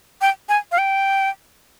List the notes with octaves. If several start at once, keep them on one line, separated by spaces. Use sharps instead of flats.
G5
G#5
F5
G5